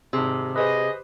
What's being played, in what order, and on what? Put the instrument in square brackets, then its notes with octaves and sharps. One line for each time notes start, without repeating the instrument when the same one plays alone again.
[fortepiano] G#1 G#4 [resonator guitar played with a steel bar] C3
[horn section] G#4 D#5 [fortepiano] B4 C5